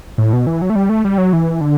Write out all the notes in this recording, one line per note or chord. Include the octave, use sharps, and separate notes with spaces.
A2
B2
E3
F#3
A3
G3
A3
G3
F#3
E3
D3